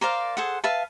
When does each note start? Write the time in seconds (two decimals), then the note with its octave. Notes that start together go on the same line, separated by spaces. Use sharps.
0.01 A#4 C5 D5 F5
0.37 G#4 A4 C5 F#5
0.64 B4 E5 F5 A5